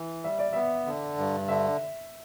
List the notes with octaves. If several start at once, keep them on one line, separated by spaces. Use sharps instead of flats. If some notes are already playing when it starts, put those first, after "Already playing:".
Already playing: E3
G3 E5
D5
B3 E5
D3
G2
D3 E5